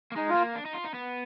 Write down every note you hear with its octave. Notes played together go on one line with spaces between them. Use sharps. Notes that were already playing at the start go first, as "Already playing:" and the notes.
A#3
G#3 D#4
F4
A#3
D4
D#4
F4
D#4
B3